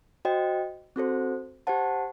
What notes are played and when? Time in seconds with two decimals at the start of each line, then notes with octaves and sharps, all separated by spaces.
0.25 F#4 C5 D#5 G5
0.96 C4 F#4 A4 C5
1.67 G4 C5 F#5 A5